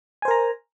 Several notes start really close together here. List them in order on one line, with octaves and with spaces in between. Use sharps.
G#5 C5 A#4 A#5